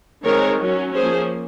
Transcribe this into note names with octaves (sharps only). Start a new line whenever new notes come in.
D#3 G#3 C4 A#4 C#5
F#3 C#4
F3 A#3 C#4 G#4 C5